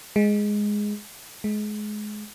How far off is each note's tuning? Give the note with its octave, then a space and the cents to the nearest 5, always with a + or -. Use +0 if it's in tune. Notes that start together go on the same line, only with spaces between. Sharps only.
G#3 +0
G#3 +25